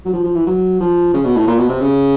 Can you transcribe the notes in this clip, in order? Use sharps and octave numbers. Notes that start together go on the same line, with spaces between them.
F#3
F3
F3
E3
F#3
F3
C#3
B2
A2
A#2
B2
C3
C#3